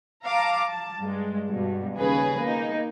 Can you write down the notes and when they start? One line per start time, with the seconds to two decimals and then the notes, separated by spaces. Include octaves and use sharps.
0.24 F5 A5 A#5 D6
0.67 A5
1.02 G2 G#3
1.50 G2 B2
1.98 D#2 C#3 G#4 B4
2.42 A#3 D#4